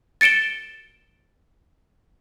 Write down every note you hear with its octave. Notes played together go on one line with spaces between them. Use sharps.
A6 C#7 D7 E7 G7